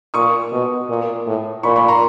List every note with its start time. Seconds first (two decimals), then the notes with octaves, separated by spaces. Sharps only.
0.14 A#2 C#6 D#6
0.52 B2
0.89 A#2
1.26 A2
1.63 A#2 B5 C#6
1.76 B5 C#6
1.88 A#5 C6